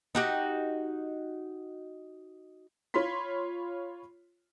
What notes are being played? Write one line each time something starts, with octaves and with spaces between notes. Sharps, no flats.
D#4 F#4 G4
F4 C#5 B5 C6 B6